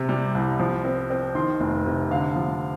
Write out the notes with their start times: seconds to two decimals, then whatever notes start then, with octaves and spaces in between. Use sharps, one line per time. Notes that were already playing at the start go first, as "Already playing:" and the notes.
Already playing: C3
0.09 G3
0.35 C2
0.60 F3
0.85 C4
1.10 C4
1.35 D#3 C6
1.60 F1
1.85 C3
2.11 D3 F5
2.36 F3